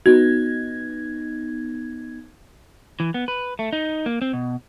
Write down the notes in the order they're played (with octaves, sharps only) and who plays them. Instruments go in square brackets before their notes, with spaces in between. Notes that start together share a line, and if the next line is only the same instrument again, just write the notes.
[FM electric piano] B3 D#4 G#6 [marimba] F#4
[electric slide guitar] E3
B3
B4
A3
D#4
A#3
C4
B2